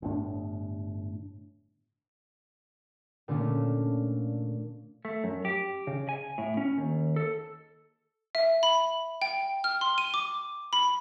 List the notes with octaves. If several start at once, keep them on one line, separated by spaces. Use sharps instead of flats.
G1 A2 D4
A#2 D3 A3 C#4 D4 F4
A3
F#2
G4
C#3
G#5
A2
C#4
D#2
A4
E5
B5
G5
F6
C6
D#7
D6
B5